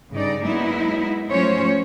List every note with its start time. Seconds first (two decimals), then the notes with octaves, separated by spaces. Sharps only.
0.11 G2 C#3 D#4 D5
0.42 F#3 G#3 A#3 B3 D#4 E4
1.30 F3 F#3 A3 C#4 C5 C#5